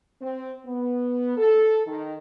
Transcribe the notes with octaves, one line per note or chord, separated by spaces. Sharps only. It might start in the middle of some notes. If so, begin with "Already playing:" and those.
C4
B3
A4
D#3